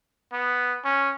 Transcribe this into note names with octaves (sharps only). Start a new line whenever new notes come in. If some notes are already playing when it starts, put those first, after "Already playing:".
B3
C#4